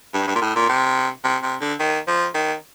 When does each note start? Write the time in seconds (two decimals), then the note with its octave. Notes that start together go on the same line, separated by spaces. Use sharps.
0.14 G2
0.27 G2
0.35 A#2
0.42 A2
0.55 A#2
0.69 C3
1.24 C3
1.42 C3
1.61 D3
1.79 D#3
2.07 F3
2.34 D#3